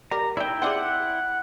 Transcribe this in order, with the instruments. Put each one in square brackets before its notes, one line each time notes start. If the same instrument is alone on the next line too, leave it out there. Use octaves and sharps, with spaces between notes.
[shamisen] G3 A#4 [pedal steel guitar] A#5
[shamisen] D#4 D5 [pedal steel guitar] E4 E5 G5
[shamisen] C4 D4 G#4 [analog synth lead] F#5